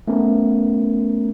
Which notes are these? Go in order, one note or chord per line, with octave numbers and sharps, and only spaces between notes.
A3 B3 C#4 A#4